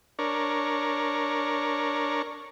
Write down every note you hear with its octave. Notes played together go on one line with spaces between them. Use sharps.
D4 A#4 C#5